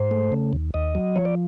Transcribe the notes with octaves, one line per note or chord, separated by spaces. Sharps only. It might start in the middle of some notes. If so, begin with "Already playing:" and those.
Already playing: G#2 C5
A3
C#3
D#2
D#2 D#5
F#3
F3 C#5
D5